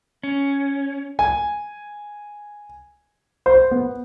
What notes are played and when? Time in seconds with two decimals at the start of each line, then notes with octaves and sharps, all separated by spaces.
0.23 C#4
1.19 G#5
3.46 C5
3.71 B3